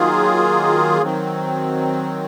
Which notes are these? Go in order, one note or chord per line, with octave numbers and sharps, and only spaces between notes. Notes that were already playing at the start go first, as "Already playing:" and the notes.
Already playing: D#3 F#3 A#3 F4 G#4
D#3 F#3 C4